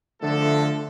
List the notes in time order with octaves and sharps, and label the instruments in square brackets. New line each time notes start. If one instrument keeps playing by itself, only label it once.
[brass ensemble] D3 F3 A3 A4